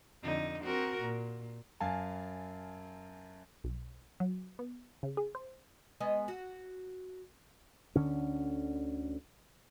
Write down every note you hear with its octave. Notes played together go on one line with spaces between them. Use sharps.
F2 D3 D#4
C4 F#4 A#4
A#2
F#2 F5 G#5 A5
B1
F#3
B3
C#3
G#4
C5
G#3 B3 D#5
F#4
D2 D3 C#4